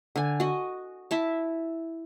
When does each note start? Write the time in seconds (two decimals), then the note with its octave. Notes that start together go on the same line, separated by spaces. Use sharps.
0.16 D3 G#5
0.40 F#4 D#5
1.11 E4 E5 A5